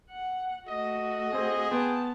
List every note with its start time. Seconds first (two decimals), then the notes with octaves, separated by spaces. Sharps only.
0.11 F#5
0.68 A3 F#4 D#5
1.33 C4 G#4 C5
1.71 B3 G5 A5 C6